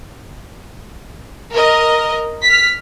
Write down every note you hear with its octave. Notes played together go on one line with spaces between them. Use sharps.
A#4 D#5
F6 B6